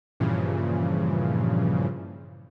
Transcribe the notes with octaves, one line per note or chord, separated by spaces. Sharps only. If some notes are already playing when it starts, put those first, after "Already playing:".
G2 A#2 C#3 E3 F3